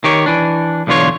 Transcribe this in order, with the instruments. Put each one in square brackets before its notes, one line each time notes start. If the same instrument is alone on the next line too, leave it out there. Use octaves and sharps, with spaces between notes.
[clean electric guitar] D#3 G4 C#5
E3 D4
B1 E2 D3 F4 C#5